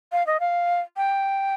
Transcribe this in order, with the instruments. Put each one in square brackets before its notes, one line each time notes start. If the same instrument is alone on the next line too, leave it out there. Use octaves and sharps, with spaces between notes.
[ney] F5
D#5
F5
G5